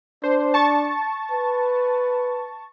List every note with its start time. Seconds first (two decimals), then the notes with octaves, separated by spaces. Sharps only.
0.24 D4 C5
0.54 A5 C#6 A6
1.31 B4